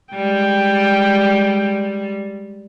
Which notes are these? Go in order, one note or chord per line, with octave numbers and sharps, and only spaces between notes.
G3 G#3 G5